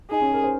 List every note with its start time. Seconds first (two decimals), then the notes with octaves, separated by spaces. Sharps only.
0.10 D#4 G#4
0.22 C#4
0.33 A#4
0.43 C5